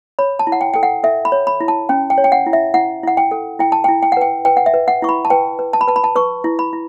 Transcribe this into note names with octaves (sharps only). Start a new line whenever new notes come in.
C#5 B5
A5
E4
F#5
G5
A4 G5
F#5
A4 E5
B5
C#5
B5
E4
A5
C#4 G5
G5
C#5
G5
F#5
E4
E5
E4 F#5
E4 F#5
G5
A4
E4 G5
A5
G5
E4
G5
F#5
B4 G5
B4 G5
F#5
E5
B4
F#5
E4 C#6
B5
A5
B4 G5
B4
A5
B5
B4 A5
B5
A5
B4 C#6
E4
B5
E4